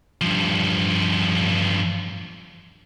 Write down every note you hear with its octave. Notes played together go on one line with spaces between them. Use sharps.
G2 F3